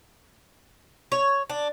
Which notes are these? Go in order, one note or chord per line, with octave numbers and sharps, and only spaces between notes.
C#5
D4